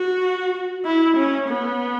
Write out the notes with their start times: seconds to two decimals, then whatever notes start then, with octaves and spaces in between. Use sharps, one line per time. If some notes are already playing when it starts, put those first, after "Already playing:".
Already playing: F#4
0.85 E4
1.17 C#4
1.48 B3